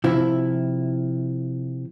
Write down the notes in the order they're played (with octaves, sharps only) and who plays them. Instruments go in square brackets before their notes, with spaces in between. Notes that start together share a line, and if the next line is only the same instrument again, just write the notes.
[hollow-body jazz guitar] C3 F3 E4